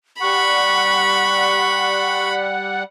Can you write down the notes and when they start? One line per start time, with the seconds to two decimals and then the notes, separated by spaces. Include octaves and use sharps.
0.21 G3 F#5 B5 C#6